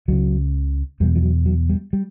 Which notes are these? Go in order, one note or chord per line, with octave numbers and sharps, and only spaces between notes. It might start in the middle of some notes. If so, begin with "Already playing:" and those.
C#2 C#3 F#3
E2 B2 G3
F3
F#3
F#3
G3
G3